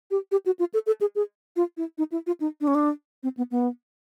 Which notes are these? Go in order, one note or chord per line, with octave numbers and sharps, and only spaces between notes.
G4
G4
F#4
F4
A4
A4
G#4
G#4
F4
E4
D#4
E4
F4
D#4
D4
C#4
D4
C4
B3
B3